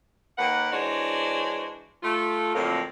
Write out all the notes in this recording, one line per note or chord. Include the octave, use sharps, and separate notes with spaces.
D#2 A#3 B4 F#5
E3 G#3 D4 F#4 C5 C#5
A3 F4
F2 A2 D3 F#3 A#3